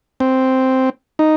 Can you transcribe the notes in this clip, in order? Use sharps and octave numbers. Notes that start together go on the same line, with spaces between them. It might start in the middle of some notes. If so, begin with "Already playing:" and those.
C4
D#4